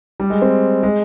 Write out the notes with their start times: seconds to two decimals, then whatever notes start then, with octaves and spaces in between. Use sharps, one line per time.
0.20 G3
0.30 G#3
0.42 C4
0.83 G#3